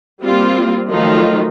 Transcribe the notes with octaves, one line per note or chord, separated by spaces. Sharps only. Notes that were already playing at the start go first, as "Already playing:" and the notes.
G3 A#3 C4 F4
D#3 F3 F#3 A3 D#4 F4